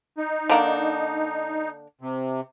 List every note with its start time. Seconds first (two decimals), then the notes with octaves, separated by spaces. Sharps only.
0.18 D#4
0.49 D3 A#3 D4
2.01 C3